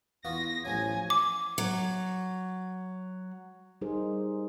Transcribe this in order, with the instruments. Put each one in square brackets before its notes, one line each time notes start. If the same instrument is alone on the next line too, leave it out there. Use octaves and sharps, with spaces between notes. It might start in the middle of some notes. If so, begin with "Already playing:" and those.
[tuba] E2 [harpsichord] B3 F4 F#4 [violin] A#6
[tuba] A1 [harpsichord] F3 F#3 [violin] G#5
[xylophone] D6
[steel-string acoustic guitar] F#3
[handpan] G3 D#4 G4 G#4 A#4 C5